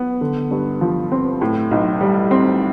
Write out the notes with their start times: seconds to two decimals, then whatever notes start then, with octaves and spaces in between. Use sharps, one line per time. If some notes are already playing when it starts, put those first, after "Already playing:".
Already playing: B3
0.21 D3
0.51 G2
0.81 F3
1.12 C4
1.41 A2
1.71 B1
2.01 G3
2.31 C4